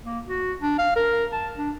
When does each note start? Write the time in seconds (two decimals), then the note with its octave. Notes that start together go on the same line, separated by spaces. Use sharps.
0.04 A#3
0.27 F#4
0.62 D4
0.78 F5
0.96 A#4
1.33 A5
1.57 D4